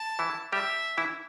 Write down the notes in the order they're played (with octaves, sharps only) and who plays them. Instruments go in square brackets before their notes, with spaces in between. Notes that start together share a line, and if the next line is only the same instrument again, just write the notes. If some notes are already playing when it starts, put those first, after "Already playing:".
Already playing: [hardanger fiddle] A5
[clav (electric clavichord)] E3 E4
[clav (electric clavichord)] G3 G4 [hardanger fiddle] E5
[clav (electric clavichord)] E3 E4